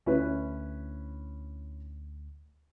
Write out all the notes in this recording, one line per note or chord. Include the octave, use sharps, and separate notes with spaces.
D2 C#4 E4 B4